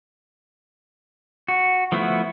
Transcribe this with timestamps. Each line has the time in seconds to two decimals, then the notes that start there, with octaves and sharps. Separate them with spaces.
1.48 F#4
1.92 F3 A3 B3 E4 F#4